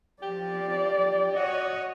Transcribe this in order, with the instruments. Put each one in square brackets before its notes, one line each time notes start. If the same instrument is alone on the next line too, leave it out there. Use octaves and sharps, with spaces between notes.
[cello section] F3 [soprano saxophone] G4 [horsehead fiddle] D5
[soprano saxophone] F#4 [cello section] C#5 D#5